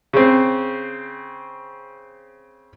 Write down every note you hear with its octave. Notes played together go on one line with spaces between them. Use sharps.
C#3 C4